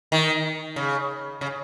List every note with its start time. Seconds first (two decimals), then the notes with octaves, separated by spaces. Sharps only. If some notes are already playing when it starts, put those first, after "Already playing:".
0.12 D#3
0.76 C#3
1.41 C#3